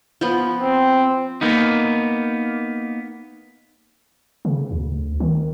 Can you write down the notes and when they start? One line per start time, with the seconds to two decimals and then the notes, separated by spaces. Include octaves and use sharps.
0.21 F3 B3
0.61 C4
1.41 A#3 B3 D#4
4.45 C#3
4.71 D2
5.20 D#3